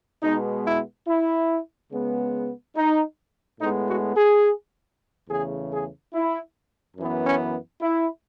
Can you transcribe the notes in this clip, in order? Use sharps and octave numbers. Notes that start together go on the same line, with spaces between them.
B2 G#3 B3 D#4
E4
E4
C#3 G#3 B3
D#4
A2 G#3 B3 D#4
F#4
G#4
E2 C#3 E3 A3 G#4
G#4
E4
F#2 E3 B3
C#4
E4